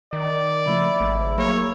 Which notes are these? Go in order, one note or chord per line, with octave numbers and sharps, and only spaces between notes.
D#3 D5
C#3 F3 A3 E4
G#1 A3
F#3 A#3 G#4 C#5